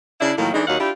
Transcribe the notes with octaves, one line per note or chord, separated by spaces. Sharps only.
C#3 D4 E4
A2 D#3 F3 F#3 A#3
E3 G#3 A3 D4 D#4
D#2 F#3 D#4 F5 F#5
D4 E4 F4 G4